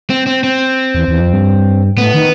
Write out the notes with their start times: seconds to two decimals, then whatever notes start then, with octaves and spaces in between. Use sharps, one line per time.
0.10 C4
0.27 C4
0.44 C4
0.95 E2
1.08 E2
1.20 F2
1.33 G2
1.97 A2 B3
2.14 D#3